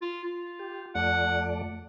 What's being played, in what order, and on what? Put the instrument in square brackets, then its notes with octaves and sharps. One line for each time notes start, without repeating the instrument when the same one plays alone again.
[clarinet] F4
F4
[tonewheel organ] G4
[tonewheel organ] F2 A3 D5 [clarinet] F#5